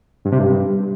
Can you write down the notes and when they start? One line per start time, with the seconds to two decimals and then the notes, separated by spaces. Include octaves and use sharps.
0.25 G2
0.32 C3
0.39 G2